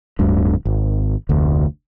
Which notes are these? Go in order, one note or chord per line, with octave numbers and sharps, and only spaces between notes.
D1 D2 G2 D3
G#1
F1 D2